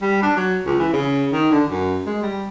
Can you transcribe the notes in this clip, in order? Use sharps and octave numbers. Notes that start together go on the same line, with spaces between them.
G3
D4
F#3
C#2
E3
C#3
D#3
D3
F#2
G#3
G3